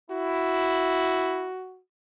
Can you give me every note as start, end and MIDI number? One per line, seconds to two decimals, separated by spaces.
0.11 1.49 64
0.11 1.81 66